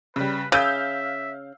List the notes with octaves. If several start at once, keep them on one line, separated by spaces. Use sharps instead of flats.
C#3 G3 B4
C#3 E5 F5 E6 G6